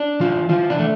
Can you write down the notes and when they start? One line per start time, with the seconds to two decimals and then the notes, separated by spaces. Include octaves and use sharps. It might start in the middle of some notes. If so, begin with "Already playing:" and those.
Already playing: D4
0.20 E3 F4
0.50 E3 F4
0.70 D4
0.79 A3